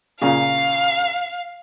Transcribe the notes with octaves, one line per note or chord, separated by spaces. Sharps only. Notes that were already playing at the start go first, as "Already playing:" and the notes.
A#2 C#3 F5